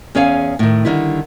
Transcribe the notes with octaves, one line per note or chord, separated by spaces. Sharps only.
E2 C#4 G#4 C#5 F5 G#5
A2 D#3
D3 D#3 G3 E4